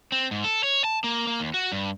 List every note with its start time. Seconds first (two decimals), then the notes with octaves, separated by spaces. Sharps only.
0.12 C4
0.31 G#2
0.44 A4
0.64 C#5
0.84 A5
1.04 A#3
1.27 A#3
1.40 D#2
1.54 F#4
1.72 G2